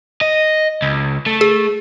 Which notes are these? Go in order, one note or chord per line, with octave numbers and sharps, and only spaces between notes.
D#5
C#2
A3
G#4